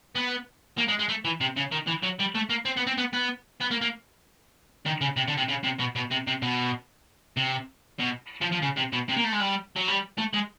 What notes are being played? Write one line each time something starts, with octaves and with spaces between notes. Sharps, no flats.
B3
A#3
G#3
G#3
A3
E3
C3
C#3
D#3
E3
F#3
G3
A3
A#3
C4
B3
C4
B3
B3
B3
A#3
A#3
D#3
C#3
C3
D3
C3
C#3
C3
B2
B2
C3
C3
B2
C3
B2
F3
F3
C#3
C3
B2
C3
A#3
A3
G#3
G3
F#3
G3
A3
G#3